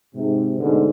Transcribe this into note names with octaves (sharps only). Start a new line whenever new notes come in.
G#2 C3
D2 G#2 B2 D3